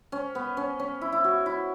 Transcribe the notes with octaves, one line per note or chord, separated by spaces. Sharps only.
C#4
B3
C#4
C#4
E4
E4
F#4
E4